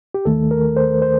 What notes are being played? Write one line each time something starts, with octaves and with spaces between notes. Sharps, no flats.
G4
D#2 D#3 A3 A4
A#4
C5
C5